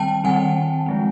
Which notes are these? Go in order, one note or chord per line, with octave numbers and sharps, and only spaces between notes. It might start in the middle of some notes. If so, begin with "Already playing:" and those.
Already playing: D#3 G3 C4 G5 A5
D#3 G3 C4 F#5 G#5
F3 G#3 C4